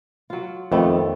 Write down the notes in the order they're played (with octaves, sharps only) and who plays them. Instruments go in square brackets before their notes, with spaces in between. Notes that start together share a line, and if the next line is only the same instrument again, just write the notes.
[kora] F#3 F4
[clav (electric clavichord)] F2 [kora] D#3 A3 B3